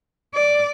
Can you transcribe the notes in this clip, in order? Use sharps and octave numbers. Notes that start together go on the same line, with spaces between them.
D5